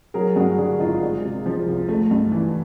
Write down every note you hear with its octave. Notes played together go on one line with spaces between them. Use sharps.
F#3 G#4 A#4
G2 F#4 G#4
D3 F#4 G#4
G#1 D#4 F4
G#3
C3
F3
C2
A3
G2
E3